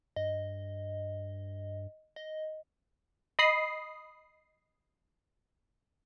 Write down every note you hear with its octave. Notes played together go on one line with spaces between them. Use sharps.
G2 D#5
D#5
D#5 B5 D#6 C7